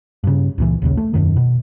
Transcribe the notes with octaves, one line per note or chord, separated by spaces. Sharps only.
G2 C#3
C#2 A#2 E3
A#1 D#2 C#3
A3
E1 B1 F#2 D#3
B2